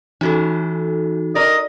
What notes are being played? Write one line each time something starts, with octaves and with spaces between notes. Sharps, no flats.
E3 A3 C#4 D#4 F#4 A4
D#4 A#4 D5 D#5